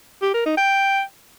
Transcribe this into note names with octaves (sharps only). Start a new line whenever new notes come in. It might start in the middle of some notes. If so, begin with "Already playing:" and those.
G4
A#4
D#4
G5